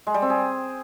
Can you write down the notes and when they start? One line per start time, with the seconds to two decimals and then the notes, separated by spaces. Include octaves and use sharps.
0.07 G#3
0.14 G3
0.22 C4
0.30 G#4